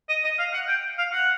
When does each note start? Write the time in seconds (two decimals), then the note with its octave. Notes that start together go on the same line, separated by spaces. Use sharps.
0.09 D#5
0.24 D#5
0.38 F5
0.53 F#5
0.68 G5
0.98 F5
1.12 F#5